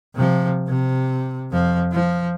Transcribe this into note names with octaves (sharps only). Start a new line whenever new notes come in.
C3 F3
C3
F2 F3
F3